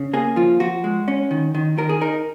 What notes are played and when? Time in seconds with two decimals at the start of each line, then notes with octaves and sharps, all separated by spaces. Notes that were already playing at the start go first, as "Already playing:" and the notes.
Already playing: C#3
0.13 A#3 G#4
0.36 F3 F4
0.60 F3 F#4
0.84 G#3
1.08 C#4
1.31 D#3
1.55 D#3
1.78 D#3 A#4
1.89 G#4
2.01 D#4 A#4